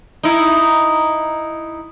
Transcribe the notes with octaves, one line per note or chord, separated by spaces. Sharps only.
D#4 E4